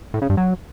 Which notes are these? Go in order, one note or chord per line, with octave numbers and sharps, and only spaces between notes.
A2
C#3
G2
F#3